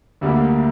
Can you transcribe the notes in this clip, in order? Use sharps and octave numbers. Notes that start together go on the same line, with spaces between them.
D2 D3 G3 A#3